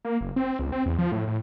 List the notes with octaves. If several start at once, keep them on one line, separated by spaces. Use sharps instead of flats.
A#3
F#1
C4
C#2
C4
E2
F3
A2
A2